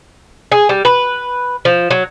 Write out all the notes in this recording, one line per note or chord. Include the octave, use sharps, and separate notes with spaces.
G#4
G3
B4
F3
F#3